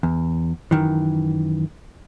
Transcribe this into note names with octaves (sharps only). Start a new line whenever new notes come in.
E2
F#2 D#3 E3